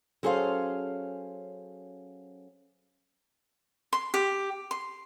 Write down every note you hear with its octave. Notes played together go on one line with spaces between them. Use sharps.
F#3 C#4 G#4 A4 C5 F5
C6
G4
C6